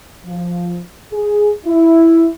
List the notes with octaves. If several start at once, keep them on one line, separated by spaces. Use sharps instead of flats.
F3
G#4
E4